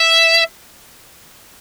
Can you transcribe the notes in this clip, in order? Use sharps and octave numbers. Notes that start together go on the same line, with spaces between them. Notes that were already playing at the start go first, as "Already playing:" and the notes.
Already playing: E5